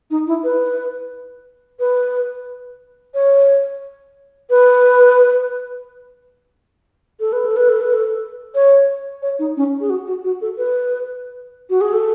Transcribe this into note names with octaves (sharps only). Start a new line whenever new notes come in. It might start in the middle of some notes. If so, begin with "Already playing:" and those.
D#4
E4
B4
B4
C#5
B4
A4
B4
A4
B4
A4
B4
A4
C#5
C#5
D#4
C#4
G#4
F#4
F#4
F#4
A4
B4
F#4
G#4
A4